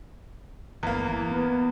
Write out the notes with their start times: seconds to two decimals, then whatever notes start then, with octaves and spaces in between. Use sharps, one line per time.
0.83 G1 E2 A#3
1.09 E3
1.31 B3